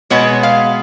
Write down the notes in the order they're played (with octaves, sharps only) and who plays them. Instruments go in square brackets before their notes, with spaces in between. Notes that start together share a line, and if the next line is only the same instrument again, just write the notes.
[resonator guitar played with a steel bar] B2 G#3 B3 C#5
F5